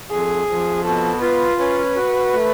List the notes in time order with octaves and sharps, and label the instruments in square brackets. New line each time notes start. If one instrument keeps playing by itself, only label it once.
[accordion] F2 [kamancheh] G#4
[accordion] F2
[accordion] B2 [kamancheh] A4
[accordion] F4 [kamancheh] B4
[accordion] C#4 [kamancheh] B4
[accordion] F#4
A3